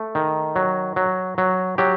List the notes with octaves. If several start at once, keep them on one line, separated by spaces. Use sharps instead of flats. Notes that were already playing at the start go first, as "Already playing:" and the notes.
Already playing: A3
D#3
F#3
F#3
F#3
F#3 G4